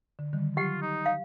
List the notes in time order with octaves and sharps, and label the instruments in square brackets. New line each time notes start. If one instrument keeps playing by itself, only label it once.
[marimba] D3
D3 D#3 G3
[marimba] F#3 [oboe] F4 [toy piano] G4 F#5
[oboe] D#4
[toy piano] F5